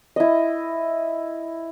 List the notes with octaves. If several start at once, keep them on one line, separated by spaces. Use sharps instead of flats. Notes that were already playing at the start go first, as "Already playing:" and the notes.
E4 D#5